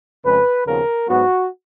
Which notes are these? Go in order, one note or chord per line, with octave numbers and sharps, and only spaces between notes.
F2 C#3 G#3 B4
D#2 C#3 F3 B3 A#4
G#2 F#3 B3 F#4